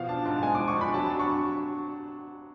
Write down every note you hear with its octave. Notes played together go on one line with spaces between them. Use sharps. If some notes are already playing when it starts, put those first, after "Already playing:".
Already playing: B2 F3 F5
D4 A5
G#2 A5
G#3 G#5
F3 D6
C#6
D4 B5
F#3 A5
D4
C#6